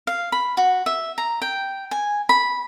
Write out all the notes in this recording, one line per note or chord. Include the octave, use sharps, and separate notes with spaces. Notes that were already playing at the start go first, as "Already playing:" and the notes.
F5
B5
F#4
E5
A#5
G5
G#5
B5